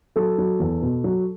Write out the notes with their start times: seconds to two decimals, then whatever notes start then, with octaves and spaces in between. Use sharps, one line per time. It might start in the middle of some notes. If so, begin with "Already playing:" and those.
0.16 F#3 A4
0.38 F#3
0.60 E2
0.82 B2
1.04 F#3